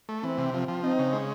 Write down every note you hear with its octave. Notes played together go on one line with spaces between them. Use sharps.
A3
E3 C4
C3
F3 C4
F3
C4 D#4
C#3
G#3